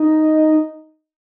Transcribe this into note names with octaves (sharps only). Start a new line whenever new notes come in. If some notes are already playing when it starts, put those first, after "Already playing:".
Already playing: D#4